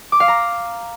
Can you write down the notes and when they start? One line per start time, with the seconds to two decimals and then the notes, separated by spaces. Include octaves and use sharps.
0.12 D6
0.20 F5
0.28 A#5